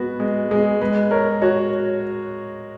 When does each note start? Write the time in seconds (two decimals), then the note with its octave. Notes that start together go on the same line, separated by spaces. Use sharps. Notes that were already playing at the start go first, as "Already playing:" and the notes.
Already playing: G#3 B3 F#4
0.20 G#3
0.51 G#3 G#4
0.81 G#3 B4
1.11 A#4 C#5
1.42 F#4 C#5